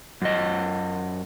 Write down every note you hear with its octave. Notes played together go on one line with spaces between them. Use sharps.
F#2 D#5